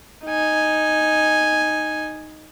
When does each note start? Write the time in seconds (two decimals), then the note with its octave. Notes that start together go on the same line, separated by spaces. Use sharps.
0.25 D#4 G#5